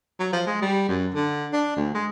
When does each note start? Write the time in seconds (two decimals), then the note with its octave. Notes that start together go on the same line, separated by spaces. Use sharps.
0.20 F#3
0.33 F3
0.46 G#3
0.62 G3
0.89 F#2
1.14 D3
1.53 D4
1.76 D2
1.94 G#3